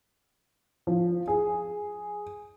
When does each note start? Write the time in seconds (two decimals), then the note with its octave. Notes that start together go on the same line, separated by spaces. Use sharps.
0.87 F3
1.28 G#4